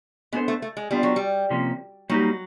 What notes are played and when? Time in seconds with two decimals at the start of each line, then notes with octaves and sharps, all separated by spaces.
0.33 G#3 B3 D4 F4 A4 C5
0.48 A3
0.62 A3
0.77 G#3
0.91 G3 B3 D4 F4
1.03 F#3
1.16 G3
1.50 C3 F3 A#3 C#4
2.09 F#3 G3 A#3 D#4 G4